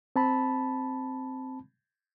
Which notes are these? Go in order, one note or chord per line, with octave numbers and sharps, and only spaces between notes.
C4 A5 B5